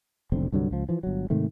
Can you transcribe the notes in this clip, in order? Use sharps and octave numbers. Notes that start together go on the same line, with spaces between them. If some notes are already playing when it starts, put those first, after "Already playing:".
F1 B1 D3 C4
C2 G2 D3 F#3
C#2 F3
E3 F3
G1 F#3
G#2 C3 D#3 A3